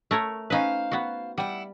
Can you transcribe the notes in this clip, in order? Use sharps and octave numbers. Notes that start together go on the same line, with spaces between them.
A3 A#4 C#5
C#4 D#4 B4 C5 F5
B3 F#4
G3 E4 F#5